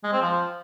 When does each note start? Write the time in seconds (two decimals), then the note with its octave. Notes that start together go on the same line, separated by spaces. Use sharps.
0.03 G#3
0.12 C4
0.21 F3